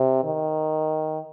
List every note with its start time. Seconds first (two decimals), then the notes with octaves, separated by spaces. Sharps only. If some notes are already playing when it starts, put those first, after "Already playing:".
Already playing: C3
0.24 D#3